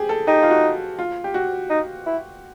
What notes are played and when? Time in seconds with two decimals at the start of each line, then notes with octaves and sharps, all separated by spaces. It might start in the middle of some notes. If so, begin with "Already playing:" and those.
Already playing: G4 G#4
0.09 A4
0.27 D#4 G4
0.42 F4
0.50 F#4
0.99 F4
1.24 G4
1.34 F#4
1.69 D#4
2.06 E4